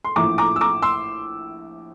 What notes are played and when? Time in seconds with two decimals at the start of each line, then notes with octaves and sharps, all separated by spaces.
0.04 C6
0.16 A#1 A2 F3 A3 A#5 D6
0.38 A#5 D6
0.56 E6
0.61 A#5 D6
0.82 C6 E6